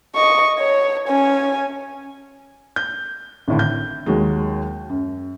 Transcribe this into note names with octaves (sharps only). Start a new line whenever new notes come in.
D#5 C#6
C#5
C#4 G#5
G6
G#1 A2 D3
G6
D#2 F#3 G#3
F#2